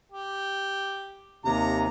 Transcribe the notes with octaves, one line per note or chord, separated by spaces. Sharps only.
G4
D#2 C3 A#5